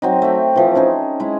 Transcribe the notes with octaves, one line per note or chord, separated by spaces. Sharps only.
F#3 C4 D#4
A3 E5 G5
E3 F3 A3
C#4 D#4 G#4
G#3 E4